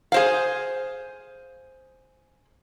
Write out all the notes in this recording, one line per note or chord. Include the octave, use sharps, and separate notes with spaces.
G#4 C5 F5